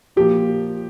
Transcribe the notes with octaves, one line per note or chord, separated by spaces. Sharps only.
A#2 F3 A#3 G4